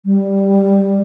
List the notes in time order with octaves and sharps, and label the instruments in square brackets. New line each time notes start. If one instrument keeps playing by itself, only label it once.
[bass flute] G3